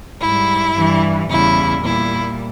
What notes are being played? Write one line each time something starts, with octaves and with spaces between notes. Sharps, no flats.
G#2 G3 E4
G2 E3 G3
E2 C#3 G3 E4
A#2 G3 E4